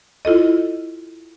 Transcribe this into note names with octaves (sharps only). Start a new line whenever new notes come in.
E4 F4 A4 D#5